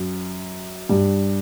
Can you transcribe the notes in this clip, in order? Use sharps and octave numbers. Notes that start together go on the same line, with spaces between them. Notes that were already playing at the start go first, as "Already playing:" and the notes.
Already playing: F#2
G2